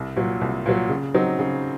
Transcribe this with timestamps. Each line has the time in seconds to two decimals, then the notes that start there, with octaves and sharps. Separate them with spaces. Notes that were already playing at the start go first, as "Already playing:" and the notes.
Already playing: C2
0.16 A#2 F#3
0.41 C2
0.66 A#2 F#3
0.89 C#3
1.15 F#3 C4 D#4
1.39 C#3